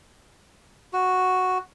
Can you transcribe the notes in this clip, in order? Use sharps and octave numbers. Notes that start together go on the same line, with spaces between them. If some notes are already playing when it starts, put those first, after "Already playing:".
F#4